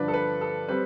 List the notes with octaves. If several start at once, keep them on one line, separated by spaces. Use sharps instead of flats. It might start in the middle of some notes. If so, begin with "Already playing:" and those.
Already playing: G2 D3 F3 B4 D5
A4
B4
A4
G3 C4 B4